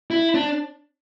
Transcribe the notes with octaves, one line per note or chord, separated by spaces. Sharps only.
E4
D4